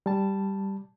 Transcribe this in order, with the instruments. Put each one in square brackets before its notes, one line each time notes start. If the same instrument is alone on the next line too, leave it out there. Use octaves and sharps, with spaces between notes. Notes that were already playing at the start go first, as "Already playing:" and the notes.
[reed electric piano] G3 A5